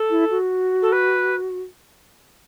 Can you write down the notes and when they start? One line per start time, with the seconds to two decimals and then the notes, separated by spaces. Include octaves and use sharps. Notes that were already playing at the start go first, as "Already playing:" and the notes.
Already playing: A4
0.10 E4
0.30 F#4
0.82 A4
0.92 B4